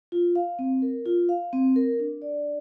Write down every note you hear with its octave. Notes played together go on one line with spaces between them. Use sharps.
F4
F5
C4
A#4
F4
F5
C4
A#4
D4
D5